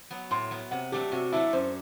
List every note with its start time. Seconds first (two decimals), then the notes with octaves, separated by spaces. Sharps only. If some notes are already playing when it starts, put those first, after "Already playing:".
0.11 F#3 B3
0.31 A2 C6
0.51 F#3 B3
0.71 C3 F#5
0.92 F#3 A3 D4 G4
1.12 C3 F#4
1.32 F#3 A3 D4 E4
1.53 F#2 C5